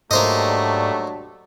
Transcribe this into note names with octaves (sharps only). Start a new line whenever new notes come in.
G#2 F#3 G3 A3 A#3 D4 C5 D#5